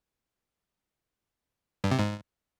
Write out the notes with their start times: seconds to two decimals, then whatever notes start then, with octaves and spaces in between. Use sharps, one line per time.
1.84 G2
1.91 C3
1.99 G#2